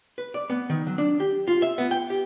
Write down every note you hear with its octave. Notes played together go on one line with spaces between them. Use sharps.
B4
D5
B3
D#3
F#3
D4
G4
F4
E5
B3
G5
G4